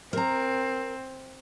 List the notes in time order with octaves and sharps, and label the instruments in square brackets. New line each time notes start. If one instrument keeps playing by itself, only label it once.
[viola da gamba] C4 [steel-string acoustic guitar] A#4 A#5